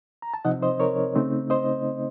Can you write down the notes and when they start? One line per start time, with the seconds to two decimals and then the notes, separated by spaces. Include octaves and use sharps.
0.22 A#5
0.34 A5
0.45 C3 F3 C4 D#4 D#5 F#5
0.62 C5 D#5
0.80 A#4 C#5
1.15 C#3 A3 C4 D#4
1.50 C5 D#5